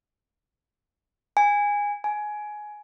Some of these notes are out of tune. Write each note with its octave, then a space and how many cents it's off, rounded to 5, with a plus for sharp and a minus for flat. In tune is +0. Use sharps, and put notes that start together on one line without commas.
G#5 -15
G#5 +15